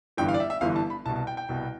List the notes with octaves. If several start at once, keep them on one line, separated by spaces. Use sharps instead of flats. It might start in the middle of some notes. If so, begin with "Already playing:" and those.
G1 G2 E3 G5
F5
D5
E5
E5
G1 G2 E3 F5
A5
B5
C2 B2 A5
A5
G5
G5
C2 B2